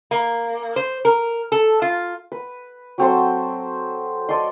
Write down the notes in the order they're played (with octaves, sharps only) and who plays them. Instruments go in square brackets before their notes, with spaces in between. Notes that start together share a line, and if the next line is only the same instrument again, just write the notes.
[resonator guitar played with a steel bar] A#3
C5
A#4
A4
F4
[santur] B4
F#3 C4 A4 C5
A4 D5 D#5 C6